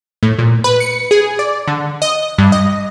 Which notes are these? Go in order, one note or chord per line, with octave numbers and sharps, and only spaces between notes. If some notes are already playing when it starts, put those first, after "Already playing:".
A2
A#2
B4
C#7
G#4
D5
D3
D#5
G2
D#5